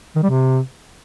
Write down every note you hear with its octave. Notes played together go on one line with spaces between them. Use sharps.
D#3
G3
C3